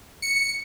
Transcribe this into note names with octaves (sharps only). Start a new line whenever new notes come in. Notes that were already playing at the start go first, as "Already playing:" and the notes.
C#7